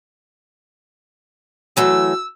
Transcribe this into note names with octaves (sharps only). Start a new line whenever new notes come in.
E3 F#3 A3 E6